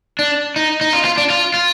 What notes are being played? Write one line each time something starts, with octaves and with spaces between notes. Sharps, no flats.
D4
D#4
D#4
F4
F4
D4
F4
F4